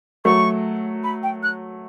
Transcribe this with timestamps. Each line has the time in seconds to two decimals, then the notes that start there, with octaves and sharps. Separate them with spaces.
0.25 F#3 A3 C#6
1.04 B5
1.23 G5
1.43 F#6